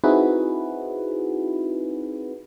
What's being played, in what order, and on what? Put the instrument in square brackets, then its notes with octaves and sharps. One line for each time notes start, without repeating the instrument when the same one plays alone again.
[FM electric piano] C4 D#4 E4 F#4 G#4 B4